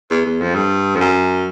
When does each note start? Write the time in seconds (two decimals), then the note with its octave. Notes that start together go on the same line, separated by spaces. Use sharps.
0.11 E2
0.26 E2
0.41 F2
0.55 G2
0.95 F2
1.00 F#2